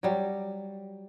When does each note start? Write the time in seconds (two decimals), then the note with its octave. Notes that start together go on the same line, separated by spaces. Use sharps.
0.03 F#3 G3